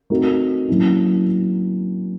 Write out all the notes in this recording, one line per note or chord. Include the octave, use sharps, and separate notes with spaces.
A3 C4 D#4 F#4 A#4
F#3 A#3 C#4 E4